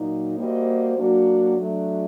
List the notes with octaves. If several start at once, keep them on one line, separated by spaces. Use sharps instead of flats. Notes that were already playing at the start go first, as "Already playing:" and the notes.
Already playing: A#2 F#3 A#3 D#4
G3 A#3 F#4 C5 D#5
F#3 A#3 D4 F#4
F#3 A3 D4